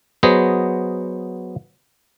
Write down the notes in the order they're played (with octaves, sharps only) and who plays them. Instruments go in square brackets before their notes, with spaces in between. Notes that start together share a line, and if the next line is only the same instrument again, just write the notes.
[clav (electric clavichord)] F#3 B3 G#4 C5 D#5